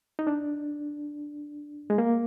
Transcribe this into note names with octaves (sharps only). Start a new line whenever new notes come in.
D#4
D4
G#3
A#3